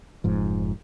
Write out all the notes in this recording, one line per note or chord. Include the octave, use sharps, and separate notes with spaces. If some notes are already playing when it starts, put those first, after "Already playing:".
F1 G#2 F3